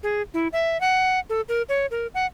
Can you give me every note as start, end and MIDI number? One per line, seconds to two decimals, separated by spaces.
0.03 0.22 68
0.34 0.48 64
0.53 0.80 76
0.81 1.19 78
1.30 1.41 69
1.49 1.62 70
1.69 1.86 73
1.91 2.07 70
2.14 2.26 78